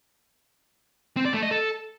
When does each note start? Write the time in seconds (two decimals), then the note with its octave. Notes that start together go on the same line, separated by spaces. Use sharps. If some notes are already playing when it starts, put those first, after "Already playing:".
1.17 C4
1.25 D5
1.34 A3
1.43 D#5
1.51 A4